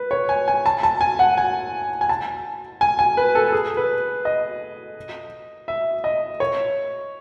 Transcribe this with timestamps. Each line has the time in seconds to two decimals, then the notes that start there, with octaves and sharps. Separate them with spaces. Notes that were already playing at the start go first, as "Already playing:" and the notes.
Already playing: B4
0.11 C#5
0.29 G#5
0.48 G#5
0.66 A5
0.83 A5
1.01 G#5
1.19 F#5
1.38 G#5
2.01 G#5
2.09 A5
2.81 G#5
2.99 G#5
3.17 B4
3.35 A4
3.48 A4
3.52 G#4
3.77 B4
4.25 D#5
5.68 E5
6.04 D#5
6.40 C#5